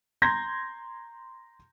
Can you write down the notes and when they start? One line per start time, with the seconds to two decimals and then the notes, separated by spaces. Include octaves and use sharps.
0.22 A#5 C6 G6 G#6 A#6